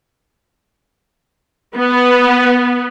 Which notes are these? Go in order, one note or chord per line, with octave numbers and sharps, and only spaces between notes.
B3